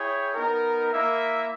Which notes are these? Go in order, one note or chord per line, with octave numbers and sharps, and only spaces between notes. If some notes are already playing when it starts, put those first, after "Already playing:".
Already playing: E4 G#4 C#5 G5
B3 D#4 A#4
A#3 E4 A#4 E5